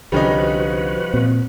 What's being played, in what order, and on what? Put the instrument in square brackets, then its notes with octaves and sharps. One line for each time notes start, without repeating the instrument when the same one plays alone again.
[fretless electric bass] C2 D3 [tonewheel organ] F3 F#4 B4 [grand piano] G3 C#4 D#4
[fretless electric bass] A#2 C4